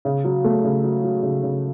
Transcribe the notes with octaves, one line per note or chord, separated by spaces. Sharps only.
C#3
F#3
A3
C#3
F#3
F#3
C#3
C#3